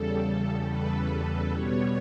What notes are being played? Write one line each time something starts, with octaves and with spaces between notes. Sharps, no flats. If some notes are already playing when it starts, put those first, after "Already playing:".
Already playing: E2 C#3 G3 A4
A4
B4
B2 G3 B3 C#5